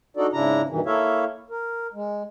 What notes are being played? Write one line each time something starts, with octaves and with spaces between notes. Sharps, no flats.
D4 D#4 F#4 A4 D5
G#2 C#3 D4 E4 A#5
G2 B2 D#3 E3
A#3 E4 A4 C#5 E5 F5
A#4
G#3